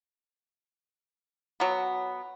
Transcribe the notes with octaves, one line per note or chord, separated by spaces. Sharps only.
F#3 B3